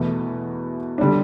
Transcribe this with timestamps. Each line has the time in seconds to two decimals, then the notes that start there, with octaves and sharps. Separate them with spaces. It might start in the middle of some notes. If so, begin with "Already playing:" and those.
Already playing: E2 B2 A3 E4
0.98 D3 G3 D4